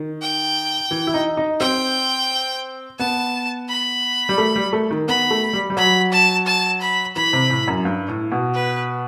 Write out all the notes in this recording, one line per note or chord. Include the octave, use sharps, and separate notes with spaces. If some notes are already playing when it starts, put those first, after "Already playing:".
Already playing: D#3
G5
E3
E4
D#4
D#4
C4 G5
B3 A5
B5
G3
A3
G3
A3
D#3
B3 B5
A3
G3
G3
F#3 B5
A5
A5
B5
E3 B5
C3
A2
F#2
G2
A2
B2
B4